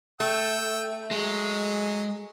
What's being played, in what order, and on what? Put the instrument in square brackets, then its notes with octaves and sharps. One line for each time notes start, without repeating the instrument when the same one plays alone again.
[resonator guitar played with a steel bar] A3 [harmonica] G5 E6
[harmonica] F#3 [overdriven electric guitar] G#3